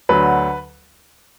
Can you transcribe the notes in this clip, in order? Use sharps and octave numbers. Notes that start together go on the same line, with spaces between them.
D2 D3 F#3 B4